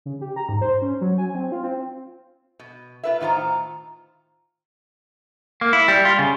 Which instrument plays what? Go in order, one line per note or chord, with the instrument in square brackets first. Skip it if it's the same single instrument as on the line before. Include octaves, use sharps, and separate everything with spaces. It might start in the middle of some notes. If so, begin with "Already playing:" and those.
[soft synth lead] C#3
G4
A#5
G#2
C5
C#4
F#3
G#5
C4
F4
C4
[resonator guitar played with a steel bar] B2
F4 B4 E5
A2 D#3 F4 C5 A#5
[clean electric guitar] A#3
E4
G3
F4
C#3